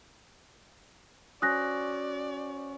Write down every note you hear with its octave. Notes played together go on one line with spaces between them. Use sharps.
C#4 F#4 C5 D5 D#6 F#6 A#6